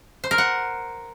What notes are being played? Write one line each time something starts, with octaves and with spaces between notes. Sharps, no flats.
C5
A#4
F#5